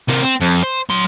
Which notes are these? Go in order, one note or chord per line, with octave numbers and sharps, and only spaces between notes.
C3 A#3
C4
F2
C5
F#3 C6